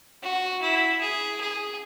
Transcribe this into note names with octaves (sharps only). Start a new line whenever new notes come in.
F#4
E4
G#4
G#4